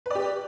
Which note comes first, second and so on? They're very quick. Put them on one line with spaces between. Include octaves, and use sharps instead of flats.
B4 D5 G4